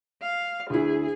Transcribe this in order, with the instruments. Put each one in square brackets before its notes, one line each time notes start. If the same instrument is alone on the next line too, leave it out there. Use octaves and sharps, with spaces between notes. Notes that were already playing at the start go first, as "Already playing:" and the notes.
[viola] F5
[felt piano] D2 E4 [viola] G#4